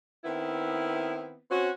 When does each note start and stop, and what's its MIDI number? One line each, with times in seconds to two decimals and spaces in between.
0.24 1.38 51
0.24 1.38 59
0.24 1.38 60
0.24 1.38 64
1.51 1.70 60
1.51 1.70 61
1.51 1.70 66